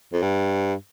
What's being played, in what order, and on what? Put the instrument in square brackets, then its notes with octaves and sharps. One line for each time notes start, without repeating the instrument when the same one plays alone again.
[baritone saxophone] F2
G2